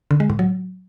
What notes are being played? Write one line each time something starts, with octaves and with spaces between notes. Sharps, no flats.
D3
G#3
A2
F#3